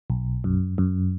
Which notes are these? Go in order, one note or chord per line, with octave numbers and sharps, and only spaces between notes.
B1
F#2
F#2